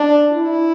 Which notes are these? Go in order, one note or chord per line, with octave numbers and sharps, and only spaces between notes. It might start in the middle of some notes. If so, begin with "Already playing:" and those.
Already playing: D4
E4